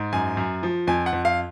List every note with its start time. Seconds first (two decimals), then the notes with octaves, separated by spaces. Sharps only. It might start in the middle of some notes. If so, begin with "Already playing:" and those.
Already playing: G#2
0.13 F#2 G#5
0.37 F#2
0.63 F3
0.87 F2 G#5
1.06 F#5
1.13 F2
1.25 F5